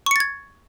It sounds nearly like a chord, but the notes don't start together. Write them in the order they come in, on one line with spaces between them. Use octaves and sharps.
C#6 C#7 A6 G#6